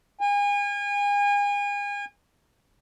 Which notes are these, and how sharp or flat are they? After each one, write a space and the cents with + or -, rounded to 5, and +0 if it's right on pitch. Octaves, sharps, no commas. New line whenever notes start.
G#5 -35